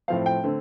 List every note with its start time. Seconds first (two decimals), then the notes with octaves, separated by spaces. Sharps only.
0.08 A2 F3 C4 F5
0.26 G5
0.44 D3 A3 C4